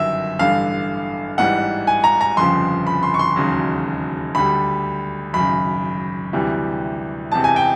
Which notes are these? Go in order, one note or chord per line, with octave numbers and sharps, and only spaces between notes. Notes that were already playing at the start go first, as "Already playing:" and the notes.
Already playing: G1 F#2 D#3 F#3 E5
A1 G2 D3 F5
A1 G#2 E3 G3 F#5
G#5
A#5
A#5
G1 F2 C#3 F3 C6
B5
C6
C#6
C6
E1 D#2 C#3 F#3
D2 D3 G3 B5
G#1 F#2 C#3 B5
D2 C3 E3 G3
E1 E2 C3 A5
G#5
G5